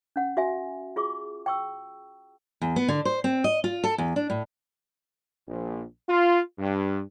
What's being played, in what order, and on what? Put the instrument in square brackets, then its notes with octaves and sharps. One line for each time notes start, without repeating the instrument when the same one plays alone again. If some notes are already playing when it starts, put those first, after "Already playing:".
[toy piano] C#4 F#5
F#4 E5 G#5
F4 G#4 C#6 D6
G5 C#6 E6
[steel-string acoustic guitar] E2
B3
D3
C5
C4
D#5
F4
A4
E2
D4
A2
[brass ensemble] A#1
F4
G2